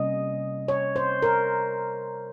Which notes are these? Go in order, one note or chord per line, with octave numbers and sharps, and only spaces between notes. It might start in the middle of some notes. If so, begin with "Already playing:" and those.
Already playing: C3 G3 A#3 C#4 D#5
C#5
C5
A#4